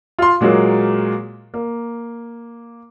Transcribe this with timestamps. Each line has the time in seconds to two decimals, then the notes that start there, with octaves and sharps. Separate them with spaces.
0.19 F4 C6
0.41 A#2 F#3 G#3 A#3
1.54 A#3